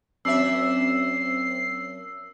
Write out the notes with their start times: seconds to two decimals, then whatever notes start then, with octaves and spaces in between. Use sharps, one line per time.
0.25 F#2 C4 D5 E5 E6 C7